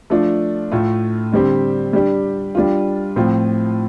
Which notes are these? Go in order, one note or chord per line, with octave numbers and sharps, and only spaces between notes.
F3 A3 D4 F4
A2 A3 F4
D3 G3 C4 G4
G3 D4 G4
G3 D4 F4
A2 F3 C4 F4